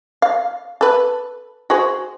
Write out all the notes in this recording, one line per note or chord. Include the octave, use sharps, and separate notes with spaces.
F5
A4 B4
F#4 G#4 C5